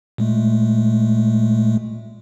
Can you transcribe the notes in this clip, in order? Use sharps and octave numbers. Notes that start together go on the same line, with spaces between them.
A#2 G#3 A3